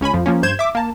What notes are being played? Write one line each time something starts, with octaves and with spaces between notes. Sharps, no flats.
C#2 C#4 G#5 B5
F2 F3
F3 A#3 C#4
G2 C5 G6 G#6 E7
E5 D6
A#3 A5